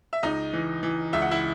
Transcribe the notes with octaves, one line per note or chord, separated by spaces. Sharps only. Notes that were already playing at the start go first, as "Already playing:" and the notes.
E5
C#2 D#4 D#5
E3
E3
C#2 E5
F#5
E4 E5